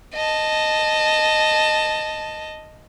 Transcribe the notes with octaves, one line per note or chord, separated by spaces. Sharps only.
D#5 A5